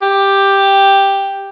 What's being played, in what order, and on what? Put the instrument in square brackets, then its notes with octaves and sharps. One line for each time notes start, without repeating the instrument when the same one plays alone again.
[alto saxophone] G4